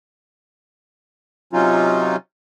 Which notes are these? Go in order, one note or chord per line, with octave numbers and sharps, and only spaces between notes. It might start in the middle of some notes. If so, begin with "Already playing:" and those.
C3 F#3 C#4 D#4 F4